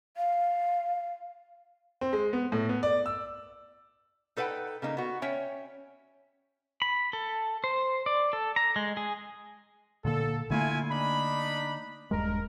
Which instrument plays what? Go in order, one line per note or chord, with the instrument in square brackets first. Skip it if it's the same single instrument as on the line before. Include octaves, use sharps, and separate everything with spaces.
[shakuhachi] F5
[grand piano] C4
G#3
B3
A2
B3
D5
E6
[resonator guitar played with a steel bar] D#4 A4 B4 F#5 G5
C#3 A#3 D#4
B3 F#4
C#4 C#5 E5 G5
[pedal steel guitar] B5
A4
C5
D5
A4
A#5
G#3
G#4
[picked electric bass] A#2 D3 A#3 [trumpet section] A4
[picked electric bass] D3 A3 A#3 [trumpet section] E4 F4 G#5
[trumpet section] D4 D#4 B5
[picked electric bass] D#1 G2 G#3 [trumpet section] A#4